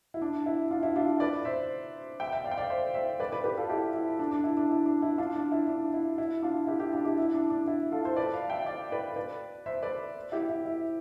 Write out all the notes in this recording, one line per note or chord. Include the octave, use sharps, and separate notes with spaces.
E4
D4
E4
D4 F4
E4
D4 F4
B4 D5
C5 E5
E5 G5
E5 G5
D5 F5
G5
D5 F5
C5 E5
C5 E5
B4 D5
B4 D5
G4 B4
F4 A4
E4 G4
E4
D4
D4
E4
D4
E4
D4
E4
D4 F4
D4
E4
D4
E4
E4
D4 F4
E4 G4
E4 G4
D4 F4
E4 G4
E4
D4
D4
E4
F4 A4
A4 C5
B4 D5
F5 A5
E5 G5
D5 F5
B4 D5
B4 D5
C5 E5
B4 D5
E4 G4
E4
E4